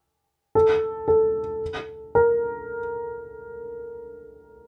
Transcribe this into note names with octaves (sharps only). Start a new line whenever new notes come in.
A4
A4
A#4